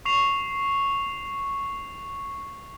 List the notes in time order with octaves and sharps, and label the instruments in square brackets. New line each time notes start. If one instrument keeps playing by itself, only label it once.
[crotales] C#6 C7 F7